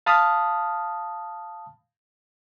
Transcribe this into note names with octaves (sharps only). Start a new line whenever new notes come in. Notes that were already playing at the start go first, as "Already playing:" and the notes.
F5 A5 B5 D#6 F6